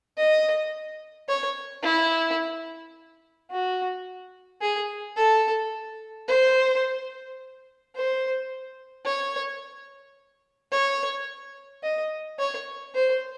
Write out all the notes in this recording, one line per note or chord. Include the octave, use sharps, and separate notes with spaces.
D#5
C#5
E4
F#4
G#4
A4
C5
C5
C#5
C#5
D#5
C#5
C5